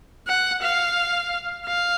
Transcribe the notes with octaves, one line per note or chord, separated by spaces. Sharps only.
F#5
F5
F5